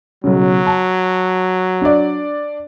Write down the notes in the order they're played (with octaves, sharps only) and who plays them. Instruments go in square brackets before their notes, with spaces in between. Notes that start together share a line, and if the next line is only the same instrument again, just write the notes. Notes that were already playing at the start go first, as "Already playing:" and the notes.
[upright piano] B1 C#3 [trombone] F#3
[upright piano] A5
D4 D5